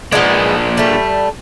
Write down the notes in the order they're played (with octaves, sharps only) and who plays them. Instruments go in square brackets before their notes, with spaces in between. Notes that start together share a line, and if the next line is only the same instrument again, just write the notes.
[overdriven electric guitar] A#2 D4 [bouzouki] G#3 B3 D#4
[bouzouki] G3 A3